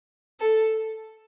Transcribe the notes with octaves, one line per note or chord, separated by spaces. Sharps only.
A4